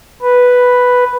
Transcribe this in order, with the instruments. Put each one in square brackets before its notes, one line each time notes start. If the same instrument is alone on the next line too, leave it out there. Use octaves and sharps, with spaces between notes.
[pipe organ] B4